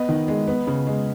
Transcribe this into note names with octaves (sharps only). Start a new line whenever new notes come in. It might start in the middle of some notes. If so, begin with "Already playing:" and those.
Already playing: B3 B4 D#5
D#3
G#3
B3
C#3
G#3